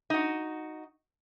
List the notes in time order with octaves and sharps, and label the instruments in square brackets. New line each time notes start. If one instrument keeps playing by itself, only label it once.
[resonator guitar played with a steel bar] D#4 F#4